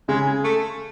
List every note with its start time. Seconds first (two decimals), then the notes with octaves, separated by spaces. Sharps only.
0.08 C#3 G#3
0.44 A3